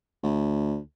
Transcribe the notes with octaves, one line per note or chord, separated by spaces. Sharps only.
D2